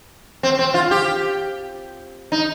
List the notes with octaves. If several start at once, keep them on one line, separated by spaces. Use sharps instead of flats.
C4
C4
F4
G4
D#4